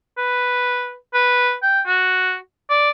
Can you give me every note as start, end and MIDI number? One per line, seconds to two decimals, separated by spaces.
0.18 0.95 71
1.14 1.54 71
1.63 1.81 79
1.87 2.37 66
2.70 2.90 74